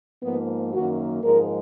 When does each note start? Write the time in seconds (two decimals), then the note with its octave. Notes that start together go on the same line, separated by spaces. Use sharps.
0.22 G#2 F3 A#3 B3
0.73 F#2 D#3 A#3 F#4
1.23 G#2 F3 G#3 A#4